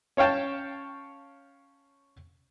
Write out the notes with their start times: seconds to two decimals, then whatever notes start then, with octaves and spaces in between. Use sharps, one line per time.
0.17 C#4 C#5 F5 G5 A5